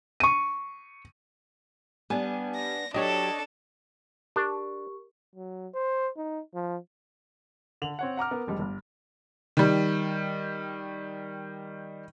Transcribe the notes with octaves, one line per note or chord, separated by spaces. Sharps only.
C#6 D#7
G3 B3 D4 G#5
A#6
F#3 D4 G4 A4 C#5 D#5
D4 G4 A#4 C#6
F#3
C5
D#4
F3
D3 F7 F#7
C4 C#5 F#5
F#5 A#5 D6 F6
B3 A#4
F1 G3 G#3
G1
D#3 G3